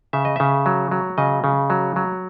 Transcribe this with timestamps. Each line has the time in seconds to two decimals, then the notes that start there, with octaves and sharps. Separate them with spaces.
0.13 C#3 E5
0.25 D#5
0.36 C#3 E5
0.66 F#3
0.91 F#3
1.18 C#3 D#5
1.44 C#3
1.70 F#3
1.96 F#3